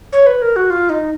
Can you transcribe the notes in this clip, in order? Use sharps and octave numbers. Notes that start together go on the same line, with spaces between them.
C#5
B4
A#4
F#4
F4
D#4